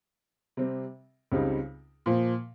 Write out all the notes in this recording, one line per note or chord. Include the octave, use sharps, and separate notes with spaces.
C3 G3 C4
C#2 C#3 G3 C4 D#4
A#2 F3 A#3